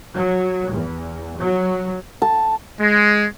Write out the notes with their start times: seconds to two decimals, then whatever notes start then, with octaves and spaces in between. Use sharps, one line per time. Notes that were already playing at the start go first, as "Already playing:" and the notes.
0.15 F#3
0.72 E2
1.38 F#3
2.22 A5
2.80 G#3